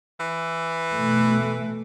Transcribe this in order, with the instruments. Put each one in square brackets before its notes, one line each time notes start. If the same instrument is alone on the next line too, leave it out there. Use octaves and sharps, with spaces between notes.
[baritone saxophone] E3
[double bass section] B2 A3